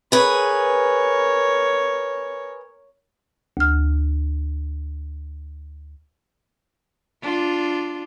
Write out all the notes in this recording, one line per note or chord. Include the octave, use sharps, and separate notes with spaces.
G#4 A#4 B4 C#5
D2 F6
D4 F4